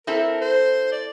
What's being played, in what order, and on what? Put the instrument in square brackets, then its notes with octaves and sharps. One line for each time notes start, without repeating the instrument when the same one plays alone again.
[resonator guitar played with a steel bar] C4 E4 A4 [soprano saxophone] A#4
[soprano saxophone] C5
D5